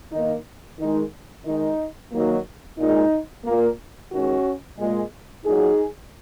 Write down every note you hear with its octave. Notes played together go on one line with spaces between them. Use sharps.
D#3 A#3 D#4
D#3 G#3 D#4
D#3 G#3 D#4
D#3 F#3 A#3
A#2 G#3 D#4
A#2 A#3
D#3 G#3 C#4 F#4
A#2 G#3
A#2 F#3 A#3 D#4 G#4